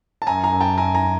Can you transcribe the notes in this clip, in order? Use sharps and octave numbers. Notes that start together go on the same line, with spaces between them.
A5
F#2 G#5 A#5
G#5 A#5
F#2
G5 A5
F#2 G#5 A#5
G#5 A#5